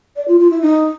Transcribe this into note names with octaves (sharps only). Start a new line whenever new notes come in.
D5
F4
F4
E4
D#4